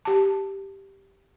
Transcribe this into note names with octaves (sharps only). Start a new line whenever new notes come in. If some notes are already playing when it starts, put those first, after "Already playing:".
G4 A5